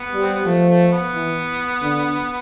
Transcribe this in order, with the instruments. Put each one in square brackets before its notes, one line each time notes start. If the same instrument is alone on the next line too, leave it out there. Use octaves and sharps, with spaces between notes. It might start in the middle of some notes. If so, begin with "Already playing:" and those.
Already playing: [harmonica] B3
[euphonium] G3
[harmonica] C4
B3
[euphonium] F3 [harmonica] A3
[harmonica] A3
B3
[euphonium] E3
D3